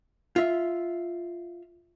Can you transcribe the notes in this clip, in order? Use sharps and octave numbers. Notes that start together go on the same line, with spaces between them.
F4 E5